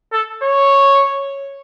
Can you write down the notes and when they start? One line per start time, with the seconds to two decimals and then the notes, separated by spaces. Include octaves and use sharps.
0.13 A4
0.43 C#5